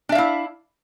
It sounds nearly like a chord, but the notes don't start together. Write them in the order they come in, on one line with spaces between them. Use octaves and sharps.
D4 E5 F5 E4